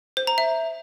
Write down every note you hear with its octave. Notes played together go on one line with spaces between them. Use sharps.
C5
A#5
E5